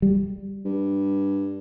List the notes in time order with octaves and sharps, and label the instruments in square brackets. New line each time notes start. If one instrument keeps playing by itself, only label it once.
[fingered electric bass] G3
[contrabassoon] G2